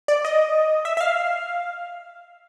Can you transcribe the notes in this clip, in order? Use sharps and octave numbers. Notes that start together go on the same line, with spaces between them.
D5
D#5
E5
E5
F5